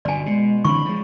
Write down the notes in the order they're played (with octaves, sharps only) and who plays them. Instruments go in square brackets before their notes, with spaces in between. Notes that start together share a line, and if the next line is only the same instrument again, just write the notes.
[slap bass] G1 B2 [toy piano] D5 G#5
[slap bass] B2 [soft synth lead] G#3
[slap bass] D3 E3 C4 [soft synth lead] B5 [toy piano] C#6
[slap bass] F3 G#3